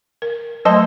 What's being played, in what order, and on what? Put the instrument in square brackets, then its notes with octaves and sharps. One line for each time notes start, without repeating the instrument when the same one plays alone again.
[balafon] A#4
[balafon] F#3 A3 [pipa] A4 C5 D#5